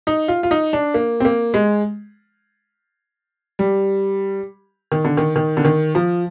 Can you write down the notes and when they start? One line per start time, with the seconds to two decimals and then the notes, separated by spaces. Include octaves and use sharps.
0.07 D#4
0.28 F4
0.43 F4
0.51 D#4
0.73 D4
0.94 A#3
1.20 C4
1.25 A#3
1.54 G#3
3.59 G3
4.92 D#3
5.05 D3
5.17 D#3
5.36 D#3
5.57 D3
5.65 D#3
5.95 F3